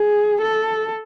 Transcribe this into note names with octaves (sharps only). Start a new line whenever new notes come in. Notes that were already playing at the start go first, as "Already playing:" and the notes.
Already playing: G#4
A4